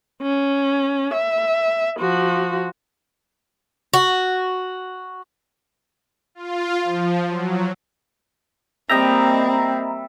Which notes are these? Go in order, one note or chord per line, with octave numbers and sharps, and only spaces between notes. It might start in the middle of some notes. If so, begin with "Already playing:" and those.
C#4
E5
F3 F#4
F#4
F4
F3
F#3
G3 A#3 C4 D#5 E5 G5 A#5